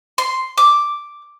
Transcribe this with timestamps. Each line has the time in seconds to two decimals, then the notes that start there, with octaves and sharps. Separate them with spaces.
0.18 C6
0.58 D6